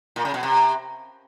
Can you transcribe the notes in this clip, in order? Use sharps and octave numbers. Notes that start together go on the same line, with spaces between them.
A#2
C#3
B2
C3